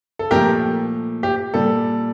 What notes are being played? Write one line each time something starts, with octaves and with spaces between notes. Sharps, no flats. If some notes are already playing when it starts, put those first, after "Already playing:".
A4
A#2 F3 A3 G4 A#4
G4
A#2 G3 A4